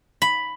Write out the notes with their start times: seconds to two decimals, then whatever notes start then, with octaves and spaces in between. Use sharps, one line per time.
0.22 B5